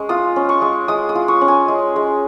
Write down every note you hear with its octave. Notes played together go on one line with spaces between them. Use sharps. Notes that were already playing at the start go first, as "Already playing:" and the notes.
Already playing: G#3 C#4
F4 D#6
C#4
C#6
G#3
G#3 D#6
D#6
F4
C#6
C#4
G#5
G#3
G#3